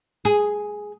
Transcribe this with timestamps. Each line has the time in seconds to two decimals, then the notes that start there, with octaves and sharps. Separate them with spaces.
0.25 G#4